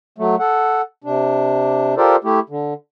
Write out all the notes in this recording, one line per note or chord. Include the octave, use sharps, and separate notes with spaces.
F#3 A3
A4 F#5
C3 D4
F4 G4 A4 A#4 C5 D5
A3 E4 G4
D3